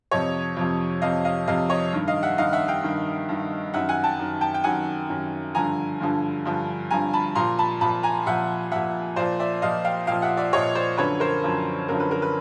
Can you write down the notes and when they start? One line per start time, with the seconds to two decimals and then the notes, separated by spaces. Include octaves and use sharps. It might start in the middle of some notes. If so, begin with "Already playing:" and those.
0.11 F2 C3 F3 C#5 D#5
0.57 F2 C3 F3
1.02 F2 C3 F3 D#5 F5
1.25 D#5 F5
1.47 F2 C3 F3 D#5 F5
1.70 C#5 D#5
1.93 G2 D#3
2.08 D#5 F5
2.23 E5 F#5
2.38 G2 D#3 D#5 F5
2.53 E5 F#5
2.68 F5 G5
2.83 G2 D#3
3.29 G2 D#3
3.74 F#2 D#3 E5 F#5
3.89 F#5 G#5
4.04 G5 A5
4.19 F#2 D#3
4.41 G5 A5
4.54 G5
4.64 F#2 D#3 F#5 G#5
5.09 F#2 D#3
5.55 G2 D3 F3 G#5 A#5
6.00 G2 D3 F3
6.45 G2 D3 F3
6.91 G2 D3 F3 G#5 A#5
7.13 A5 B5
7.35 A#2 F3 A#5 C6
7.59 A5 B5
7.81 A#2 F3 A5 B5
8.03 G#5 A#5
8.26 A#2 F3 E5 F#5
8.72 A#2 F3 E5 F#5
9.16 A#2 F3 C5 D5
9.40 D5 E5
9.62 A#2 F3 D#5 F5
9.85 F5 G5
10.07 A#2 F3 F5 G5
10.22 E5 F#5
10.37 D5 E5
10.53 A#2 F3 C#5 D#5
10.75 C5 D5
10.98 F#2 D3 F3 B4 C#5
11.20 A#4 C5
11.44 F#2 D3 F3
11.88 F#2 D3 F3 A#4
12.00 B4
12.11 A#4
12.22 B4